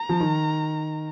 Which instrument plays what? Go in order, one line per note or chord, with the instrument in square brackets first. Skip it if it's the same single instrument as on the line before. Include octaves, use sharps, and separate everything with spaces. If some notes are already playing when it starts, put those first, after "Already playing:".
Already playing: [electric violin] A#5
[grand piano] F3
D#3